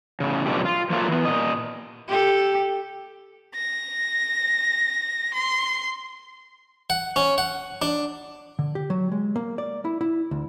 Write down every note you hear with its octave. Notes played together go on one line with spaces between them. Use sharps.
A2 C#3
F#2 B2 D3 F3 F#3 G4
F4
F3 F#3 A3 A#3 E4 F4
E3 B3
A#2 D#5
G4 A4
A#6
C6
F#5
C#4
F#5
D4
D3
G4
F#3
G#3
A#3
D5
E4
E4
D2